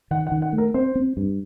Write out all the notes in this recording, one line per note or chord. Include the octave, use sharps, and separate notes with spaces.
D#3 F#5
F#5
D#3
F#5
A3
A#4
C4 C5
C4
G2